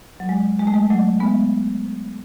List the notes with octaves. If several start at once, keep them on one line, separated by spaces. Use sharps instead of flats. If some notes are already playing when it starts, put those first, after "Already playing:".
F#3
G#3
G#3
A3
G#3
F#3 A3
G#3 B3